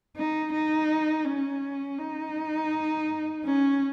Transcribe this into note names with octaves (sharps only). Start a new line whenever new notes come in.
D#4
D#4
C#4
D#4
C#4